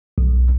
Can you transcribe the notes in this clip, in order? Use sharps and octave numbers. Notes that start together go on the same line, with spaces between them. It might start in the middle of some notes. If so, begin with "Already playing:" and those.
B1